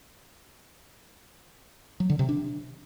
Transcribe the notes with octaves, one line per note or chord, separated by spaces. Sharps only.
F#3
D3
C3
D4